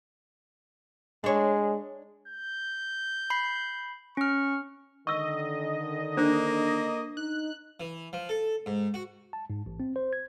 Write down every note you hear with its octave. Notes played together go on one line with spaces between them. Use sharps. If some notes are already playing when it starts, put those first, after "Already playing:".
G#3 D4 C#5
G6
B5 C7
C#4 C#6 F6
D3 D#3 D#5 C#6 E6
A#3 D4 A4 C5
D#4 F#6
E3
F3
A4
G#2
F#4
A5
G#2
A1
C4
C5
G#6